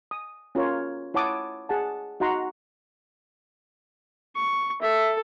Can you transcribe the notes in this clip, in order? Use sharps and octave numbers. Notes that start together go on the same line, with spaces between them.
D#6
C#4 F4 A#4 C#5
E4 C#5 F#5 A5 D6 D#6
G#4 F#5 A5
D#4 F#4 F#5 A#5 C6
C#6
A4 E5